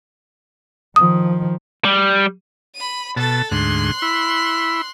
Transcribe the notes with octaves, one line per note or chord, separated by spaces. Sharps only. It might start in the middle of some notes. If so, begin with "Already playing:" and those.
D#3 F3 D#6
G3
B5 D#7
B2 A4 A5 A6
D2 G#2 C6 F#6
E4 B5